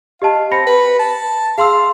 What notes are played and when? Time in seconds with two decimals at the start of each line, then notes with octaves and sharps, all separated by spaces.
0.22 G4 D#5 F5 A5
0.52 C4 B5 A#6 C#7
0.67 B4
0.99 A5
1.58 G#4 F5 C6 E6